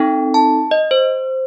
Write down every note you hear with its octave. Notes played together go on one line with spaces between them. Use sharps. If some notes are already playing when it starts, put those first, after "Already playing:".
Already playing: C4 D#4 A4 G5
A5
D#5
C5